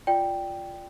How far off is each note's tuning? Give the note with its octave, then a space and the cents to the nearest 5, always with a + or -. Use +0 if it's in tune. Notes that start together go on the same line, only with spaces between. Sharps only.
F4 +0 D5 +0 G5 +0